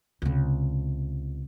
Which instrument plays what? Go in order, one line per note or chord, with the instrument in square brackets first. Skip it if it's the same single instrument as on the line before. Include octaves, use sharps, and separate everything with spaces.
[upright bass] C#2 C3